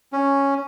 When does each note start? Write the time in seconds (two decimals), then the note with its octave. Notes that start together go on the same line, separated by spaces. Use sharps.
0.13 C#4